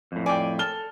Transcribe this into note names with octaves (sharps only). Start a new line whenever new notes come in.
F2 A2
D5 G5 G#5
A4 F6 G7